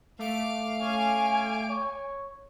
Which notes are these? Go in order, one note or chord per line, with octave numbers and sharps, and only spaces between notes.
A3 F5 D6 D7
C#4 G#5
C#5